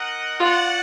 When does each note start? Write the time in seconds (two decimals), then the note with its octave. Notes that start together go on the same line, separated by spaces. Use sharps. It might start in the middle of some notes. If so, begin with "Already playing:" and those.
Already playing: D#4 A#4 D#5 F#5
0.39 F4 F#4 D5 F#5